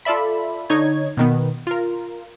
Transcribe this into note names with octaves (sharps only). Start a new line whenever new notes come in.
F4 A4 D5 E5 B5
D3 D#4 C#5 G#6
B2 D#3 B3
F4 A#4